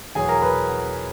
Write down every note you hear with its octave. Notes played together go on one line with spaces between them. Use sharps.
E2 B2 F#3 G#4 G#5
A#4 A#5
B4 B5